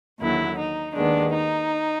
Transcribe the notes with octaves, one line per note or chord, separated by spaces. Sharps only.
D#2 D3 F#3 E4
D#4
D#2 D#3 G#3 B3 D4
D#4